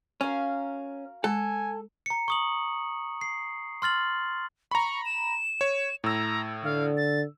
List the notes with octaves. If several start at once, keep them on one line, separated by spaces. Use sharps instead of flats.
C#4 F#4 A#4 F5
G#3 A4 G#5
A#5 C#7
C#6 D#6 F#7
C7
C6 F6 A6 F#7
A#5 B5 C#6
E7
C#5
A2 A#5 E6
D3 F5
A6